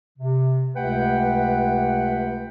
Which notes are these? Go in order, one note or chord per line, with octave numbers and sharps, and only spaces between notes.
C3
C#2 C3 A3 B4 F#5 G5